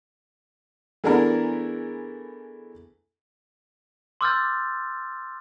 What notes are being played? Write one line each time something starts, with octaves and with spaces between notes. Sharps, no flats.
E3 A3 B3 D4 G#4 A#4
C6 D6 E6 F6 G6 A6